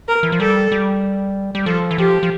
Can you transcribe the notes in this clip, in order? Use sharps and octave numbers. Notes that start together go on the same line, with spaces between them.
A#4
E3
F3
G3 A4
G3
G3
F3 A4
E3
F3 G4
F3